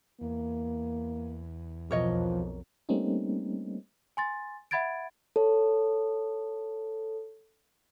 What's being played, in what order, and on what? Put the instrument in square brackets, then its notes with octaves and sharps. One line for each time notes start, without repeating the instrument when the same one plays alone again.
[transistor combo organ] E2 [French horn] A#3
[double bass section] B1 F2 [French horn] F3 [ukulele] A#4 C#5 D#5
[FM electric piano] G3 A3 A#3 C4 C#4 D#4
[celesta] G#5 C6 A6
E5 F#5 B5 G#6 A6 D7
[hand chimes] A4 C#5